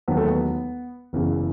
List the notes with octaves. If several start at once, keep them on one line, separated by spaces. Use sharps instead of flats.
E1 D#2 D#3 F#3 B3
A3
B3
F#1 E2 C#3 E3